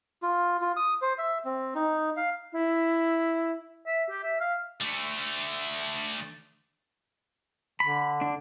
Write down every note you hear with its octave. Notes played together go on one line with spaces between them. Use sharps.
F4
F4
D#6
C5
E5
C4
D#4
F5
E4
E5
G4
E5
F5
D3 A3
D3 B5
D4